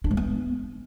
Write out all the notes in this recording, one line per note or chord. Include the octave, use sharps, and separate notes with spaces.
D4
G#3
B3